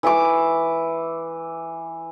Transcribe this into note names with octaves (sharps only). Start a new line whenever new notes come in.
E3 E5 C#6 D6